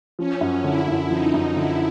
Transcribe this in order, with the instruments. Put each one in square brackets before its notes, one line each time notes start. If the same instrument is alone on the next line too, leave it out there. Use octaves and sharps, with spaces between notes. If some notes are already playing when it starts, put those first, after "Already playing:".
[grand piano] F3 [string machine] C#4
[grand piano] F#2
[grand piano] D3 [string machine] E4
[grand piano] F#2
[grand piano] F3 [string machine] D#4
[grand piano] F#2
[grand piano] D3 [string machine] E4